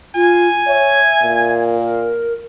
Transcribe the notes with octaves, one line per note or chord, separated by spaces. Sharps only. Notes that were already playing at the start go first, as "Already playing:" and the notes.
F4 G#5
C#5 E5
A#2
A#4